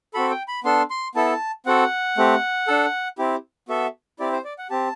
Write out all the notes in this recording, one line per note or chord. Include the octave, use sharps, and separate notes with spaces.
C4 F#4 A4 B5
G5
B5
B3 D4 A4 C6
C6
B3 E4 A4 A5
C4 F#4 A4 F#5
A3 C4 G4
D4 A4
C4 E4 G4
B3 F#4 A4 E5
C4 E4 G4 D5
C5
D5
F#5
C4 G4 A5